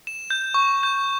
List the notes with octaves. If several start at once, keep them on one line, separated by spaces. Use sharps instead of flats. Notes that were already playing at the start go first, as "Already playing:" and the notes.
E7
G6
C#6
G6